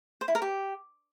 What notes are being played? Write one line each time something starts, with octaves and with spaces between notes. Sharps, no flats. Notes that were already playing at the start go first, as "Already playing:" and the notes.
C5
E4
A#4
G4